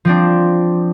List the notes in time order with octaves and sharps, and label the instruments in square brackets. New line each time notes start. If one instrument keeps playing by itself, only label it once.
[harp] F3 C4 D4